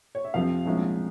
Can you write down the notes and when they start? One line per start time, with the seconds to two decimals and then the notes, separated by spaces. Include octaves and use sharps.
0.15 C#5
0.24 E5
0.34 F2 C3 F3 C4 F5
0.65 C2 A#2 F3 G#3 C#4